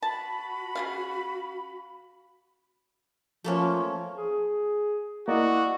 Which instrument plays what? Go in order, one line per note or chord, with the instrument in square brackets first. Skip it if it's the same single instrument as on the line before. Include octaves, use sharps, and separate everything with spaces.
[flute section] F#4 B5 [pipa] A5
[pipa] C#3 D4 F5
[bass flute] F3 [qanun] A3 A#3 C#4
[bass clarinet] G#4
[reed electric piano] A#3 D5 D#5 [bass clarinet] E4 [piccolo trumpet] F#4